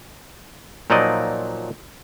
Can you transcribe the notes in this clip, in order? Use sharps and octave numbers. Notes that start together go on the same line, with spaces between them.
A#2 F3 F#3 D#4 D5 D#5